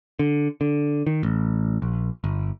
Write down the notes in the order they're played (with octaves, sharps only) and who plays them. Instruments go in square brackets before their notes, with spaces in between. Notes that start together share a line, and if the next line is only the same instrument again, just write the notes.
[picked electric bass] D3
D3
D#3
A1
A#1
G1